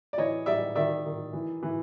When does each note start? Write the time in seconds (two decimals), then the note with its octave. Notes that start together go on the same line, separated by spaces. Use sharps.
0.13 D5
0.18 E3 C#5 D#5
0.46 G3 D5 E5
0.75 D#3 D5 E5
1.05 D#3
1.33 E3
1.63 E3